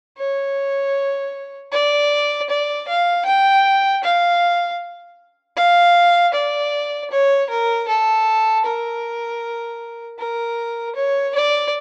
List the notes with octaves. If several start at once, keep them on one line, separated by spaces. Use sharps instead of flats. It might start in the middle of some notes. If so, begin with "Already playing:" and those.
C#5
D5
D5
F5
G5
F5
F5
D5
C#5
A#4
A4
A#4
A#4
C#5
D5